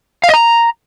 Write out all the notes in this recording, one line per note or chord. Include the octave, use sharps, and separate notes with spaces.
F5
D#5
A#5